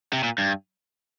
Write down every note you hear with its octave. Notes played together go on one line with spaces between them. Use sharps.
C3
A#2
G2